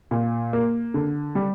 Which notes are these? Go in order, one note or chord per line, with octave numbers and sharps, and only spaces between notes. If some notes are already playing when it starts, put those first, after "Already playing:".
A#2
A#3
D3
G3